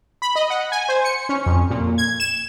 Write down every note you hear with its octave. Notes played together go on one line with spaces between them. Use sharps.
B5
D#5
F#5
G#5
C5
C#7
C#4
F2
A#2
G#6
E7